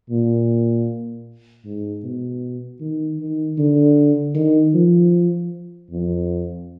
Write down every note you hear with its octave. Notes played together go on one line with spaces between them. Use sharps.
A#2
G#2
B2
D#3
D#3
D3
D#3
F3
F2